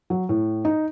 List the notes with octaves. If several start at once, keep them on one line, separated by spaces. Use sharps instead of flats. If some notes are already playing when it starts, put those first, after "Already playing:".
F#3
A2
D#4